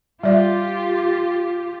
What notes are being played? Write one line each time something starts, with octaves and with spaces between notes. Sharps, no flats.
G3 F4 G4 D5 E5